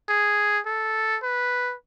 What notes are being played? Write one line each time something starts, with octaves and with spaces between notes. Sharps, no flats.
G#4
A4
B4